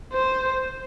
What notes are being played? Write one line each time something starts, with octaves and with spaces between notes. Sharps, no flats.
C5